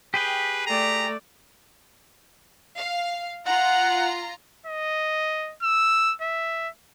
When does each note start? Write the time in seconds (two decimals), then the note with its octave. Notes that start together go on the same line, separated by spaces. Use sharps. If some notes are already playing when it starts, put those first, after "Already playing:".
0.14 G4 G#4 B4 G5
0.66 A3 D5 A#5
2.76 F5
3.47 F4 F#5 A#5
4.66 D#5
5.62 E6
6.21 E5